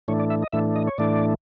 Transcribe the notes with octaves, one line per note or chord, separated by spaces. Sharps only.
A2 E3 A3 D4 C#5
D5
E5
D#5
A2 E3 A3 D4 E5
D#5
C#5
A2 E3 A3 D4 D5